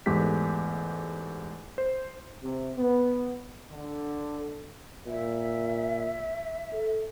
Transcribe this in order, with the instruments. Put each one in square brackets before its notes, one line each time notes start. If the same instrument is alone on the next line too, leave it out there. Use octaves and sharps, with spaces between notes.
[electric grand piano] E2 G#2 A3 G4 B6
C5
[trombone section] C3
B3
D3
[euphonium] A#2 [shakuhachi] E5
[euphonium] A4